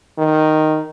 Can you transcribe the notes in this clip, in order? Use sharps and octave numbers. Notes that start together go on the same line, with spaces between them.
D#3